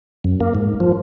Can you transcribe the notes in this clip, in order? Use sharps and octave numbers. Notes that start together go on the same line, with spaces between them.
F#2
A#3
G#2
F3